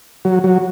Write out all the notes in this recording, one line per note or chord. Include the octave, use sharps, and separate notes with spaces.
F#3
F#3